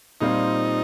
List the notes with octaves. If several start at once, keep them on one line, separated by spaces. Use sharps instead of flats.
A#2 G3 C4 D#4 F4 C5